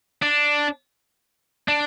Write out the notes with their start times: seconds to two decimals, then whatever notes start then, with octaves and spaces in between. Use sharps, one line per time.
0.22 D4
1.68 D4